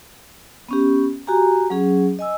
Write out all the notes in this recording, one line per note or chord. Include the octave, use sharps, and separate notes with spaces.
B3 C#4 G4
F#4 G4 G#5 A#5
F#3 C#4 G#4
D#5 G#5 E6